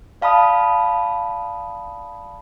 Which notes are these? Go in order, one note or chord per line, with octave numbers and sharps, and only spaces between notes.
D5 F5 A5 B5 D#6